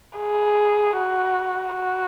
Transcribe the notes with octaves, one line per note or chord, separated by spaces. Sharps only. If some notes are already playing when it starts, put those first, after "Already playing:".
G#4
F#4
F#4